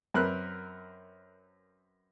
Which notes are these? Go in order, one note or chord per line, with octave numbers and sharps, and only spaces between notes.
F#2 C4 A#4 B4 F6 F#6